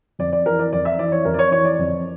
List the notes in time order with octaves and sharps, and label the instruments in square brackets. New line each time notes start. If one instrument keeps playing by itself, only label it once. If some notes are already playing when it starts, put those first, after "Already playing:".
[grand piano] F2 D5
D5
E3 A#4
D5
F2 D5
E5
E3 D5
C#5
F2 A#4
D5
C#5
E3 C#5
D5
F2